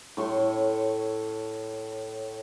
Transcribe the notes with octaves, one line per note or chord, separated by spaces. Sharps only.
A2 C#5 C6